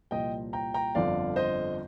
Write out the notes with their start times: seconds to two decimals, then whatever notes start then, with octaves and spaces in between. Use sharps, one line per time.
0.11 C2 A#2 F3 D#5 G5
0.53 G5 A#5
0.74 G5 A#5
0.95 G1 F2 D3 F3 D5 F5
1.36 C5 D#5